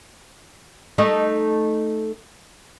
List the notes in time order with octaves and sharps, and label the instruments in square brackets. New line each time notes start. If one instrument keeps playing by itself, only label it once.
[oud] A3 D#4 D#5